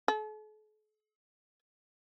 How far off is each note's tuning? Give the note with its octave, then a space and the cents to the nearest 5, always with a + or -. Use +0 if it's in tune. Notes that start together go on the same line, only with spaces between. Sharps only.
A4 -45